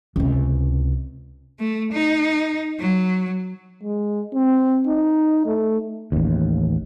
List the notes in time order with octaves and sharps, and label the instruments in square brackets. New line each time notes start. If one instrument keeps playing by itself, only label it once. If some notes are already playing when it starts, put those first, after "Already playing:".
[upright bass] C#2 C3
[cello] A3
D#4
F#3
[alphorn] G#3
C4
D#4
A3
[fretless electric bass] A1 D#2